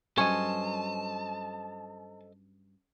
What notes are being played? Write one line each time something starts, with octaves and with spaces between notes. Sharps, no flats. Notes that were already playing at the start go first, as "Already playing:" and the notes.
G2 F#3 C#4 A4 C5 C#5 D#5 A5